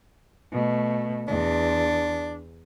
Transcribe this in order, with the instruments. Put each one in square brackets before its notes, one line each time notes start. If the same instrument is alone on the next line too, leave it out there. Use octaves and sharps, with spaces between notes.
[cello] B2 A3
[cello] E2 [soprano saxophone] D4